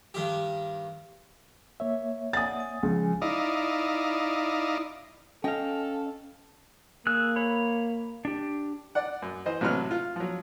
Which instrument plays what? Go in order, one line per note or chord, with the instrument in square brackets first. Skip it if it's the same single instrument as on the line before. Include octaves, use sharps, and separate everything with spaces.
[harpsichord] G2 D#3 G4
[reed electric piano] A#3 C#5 E5
[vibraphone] D5 F#5 G#5 [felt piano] D#6 A6
[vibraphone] G#5
[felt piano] C#2 [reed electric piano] F3
[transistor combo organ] D#4 E4 D5 D#5 F5
[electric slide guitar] C#4 F5 [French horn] A4 [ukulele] D#5 G5
[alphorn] A#3 [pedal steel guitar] G#4 E6 F#6
[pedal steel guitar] C#5 B5
D4 G4
[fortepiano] D5 F#5
F#2
E3 C5 D#5
A1 C3 F#3 B4 F6 F#6
F4
F3 F#3